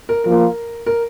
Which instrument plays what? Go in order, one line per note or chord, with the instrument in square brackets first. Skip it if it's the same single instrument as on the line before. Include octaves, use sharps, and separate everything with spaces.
[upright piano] A#4
[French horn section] F3 A#3 F4 [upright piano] A#4
[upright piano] A#4